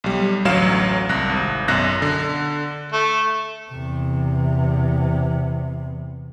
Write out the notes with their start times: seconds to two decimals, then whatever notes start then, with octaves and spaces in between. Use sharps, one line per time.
0.04 B1 G3
0.45 A1 D2 F#3 F5 E7
1.09 C2 F#6 A#6
1.30 G#1
1.68 B1 F#2 F#6 A#6
2.02 D3
2.92 A3
3.71 E2 C3